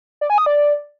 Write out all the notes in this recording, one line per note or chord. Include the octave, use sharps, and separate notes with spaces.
D5
G#5
D#6
D5